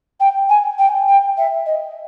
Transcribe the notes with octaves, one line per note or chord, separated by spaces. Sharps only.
G5
G#5
G5
G5
E5
D#5